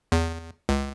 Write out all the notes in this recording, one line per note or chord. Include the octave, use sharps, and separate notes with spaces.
E2
C#2